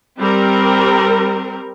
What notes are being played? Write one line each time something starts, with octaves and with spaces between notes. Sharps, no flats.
G3 C4 A#4